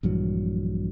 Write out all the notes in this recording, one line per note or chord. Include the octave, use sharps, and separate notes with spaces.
A#1 G2 E3 F#3